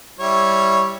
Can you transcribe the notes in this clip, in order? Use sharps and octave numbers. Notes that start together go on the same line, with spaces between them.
G3 E4 C#5